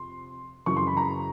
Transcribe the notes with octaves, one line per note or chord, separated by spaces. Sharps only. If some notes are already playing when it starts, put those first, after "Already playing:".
Already playing: F2 C3 C6
F#2 C#3 E3 C#6
C6
B5
A#5